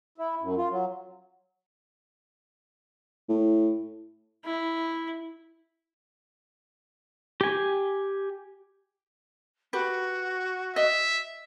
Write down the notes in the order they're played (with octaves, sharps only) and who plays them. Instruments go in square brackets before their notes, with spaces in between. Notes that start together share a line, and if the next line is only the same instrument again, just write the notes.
[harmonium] E4
F#2
F4
F#3
[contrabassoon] A2
[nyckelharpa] E4
[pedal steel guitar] G4 G#5
[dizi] F#4 [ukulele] G4 B4
[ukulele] D#5 [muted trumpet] E5